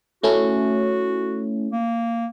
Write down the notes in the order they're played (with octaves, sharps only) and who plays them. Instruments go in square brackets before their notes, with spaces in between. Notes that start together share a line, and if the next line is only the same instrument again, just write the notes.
[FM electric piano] A3 C#4 E4 [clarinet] F#4
[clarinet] A#3